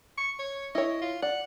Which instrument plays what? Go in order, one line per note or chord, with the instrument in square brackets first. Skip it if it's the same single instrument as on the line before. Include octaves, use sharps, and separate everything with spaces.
[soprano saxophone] C#6
C#5
[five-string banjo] E4 C#5 [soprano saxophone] D#5
[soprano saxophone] F4
[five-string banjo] D5 [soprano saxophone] F#5